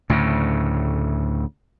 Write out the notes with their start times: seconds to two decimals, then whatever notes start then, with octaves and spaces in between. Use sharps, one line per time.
0.10 D2 A2 C#3